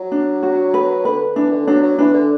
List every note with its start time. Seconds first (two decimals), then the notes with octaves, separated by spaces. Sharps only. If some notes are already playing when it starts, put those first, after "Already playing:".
Already playing: F#3
0.12 D4
0.43 F#4
0.74 B4
1.05 D3 B4
1.36 E3 D4
1.51 D3
1.67 F#3 D4
1.83 F#3
1.99 E3 D4
2.14 D3